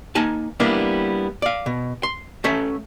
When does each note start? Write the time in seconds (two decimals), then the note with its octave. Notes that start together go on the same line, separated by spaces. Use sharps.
0.15 A#3 D#4 G#5 A5
0.60 G3 A#3 B3 D4 E4
1.42 D5 F5
1.66 B2
2.03 C6
2.44 A3 C#4 A4 E5